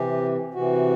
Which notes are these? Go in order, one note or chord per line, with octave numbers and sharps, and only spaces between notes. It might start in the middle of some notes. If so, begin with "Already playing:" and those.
Already playing: C3 E3 G4
C3 E3 F#4